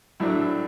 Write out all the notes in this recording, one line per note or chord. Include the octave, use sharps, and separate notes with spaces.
A2 F#3 A3 D4